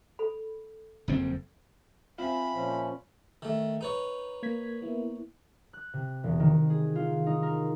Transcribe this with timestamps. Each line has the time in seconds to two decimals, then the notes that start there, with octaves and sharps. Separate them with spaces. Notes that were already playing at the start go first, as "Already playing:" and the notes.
0.19 A4 B5
1.08 F#1 F2 C4
2.18 C4 F4 E5 G#5 B5
2.54 A#2 F3 C#4
3.42 D#3 A3
3.81 D#4 B4 C#5
4.43 A#3 G#6 B6
4.82 A#3 B3 E4
5.73 F#6
5.93 C3
6.24 E1
6.40 D#3
6.70 G#4
6.96 F4
7.26 D#4
7.43 A#4